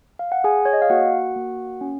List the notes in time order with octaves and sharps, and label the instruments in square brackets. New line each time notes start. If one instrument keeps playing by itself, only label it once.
[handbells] F5
F#5
G#4 G#5
C#5
D#5
F5
A#3 F#4 F#5
A#3
C#4